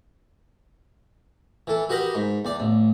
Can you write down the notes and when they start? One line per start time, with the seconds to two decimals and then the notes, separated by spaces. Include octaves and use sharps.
1.67 E3 A4
1.89 F#4 G4 A#4 B4 D#5 G5
2.15 G#2
2.45 E2 D5
2.60 A1